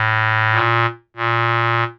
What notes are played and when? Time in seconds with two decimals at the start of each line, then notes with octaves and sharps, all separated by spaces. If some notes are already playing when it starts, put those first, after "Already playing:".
Already playing: A2
0.53 A#2
1.17 A#2